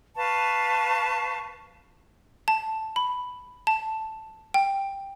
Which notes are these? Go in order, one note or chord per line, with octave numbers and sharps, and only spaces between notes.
B4 F5 A5 C#6
A5
B5
A5
G5